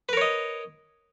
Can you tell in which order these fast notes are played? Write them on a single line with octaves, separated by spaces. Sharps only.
B4 A#4 C#5 D#5